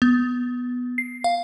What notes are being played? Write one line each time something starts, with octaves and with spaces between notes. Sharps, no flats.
B3
C7
F5